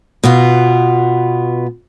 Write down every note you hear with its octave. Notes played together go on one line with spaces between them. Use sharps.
B2 B3 F4